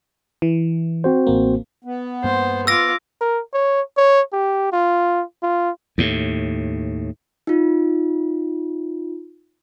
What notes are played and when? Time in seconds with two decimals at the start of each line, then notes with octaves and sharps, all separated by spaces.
0.42 E3
1.04 C4 F#4 C5
1.27 A1 A#3
1.84 B3
2.24 G2 A#3 C5
2.67 F4 D6 E6 A#6
3.21 A#4
3.53 C#5
3.97 C#5
4.33 G4
4.72 F4
5.43 F4
5.98 D#2 A2
7.47 D#4 F4